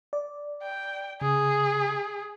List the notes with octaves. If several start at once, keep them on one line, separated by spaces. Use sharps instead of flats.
D5
G5
C#3 G#4